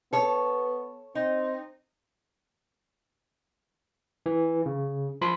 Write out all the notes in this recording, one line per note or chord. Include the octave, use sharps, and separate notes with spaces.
B3 A4 C#5
C4 D#4
E3
C#3
F3 B5 C6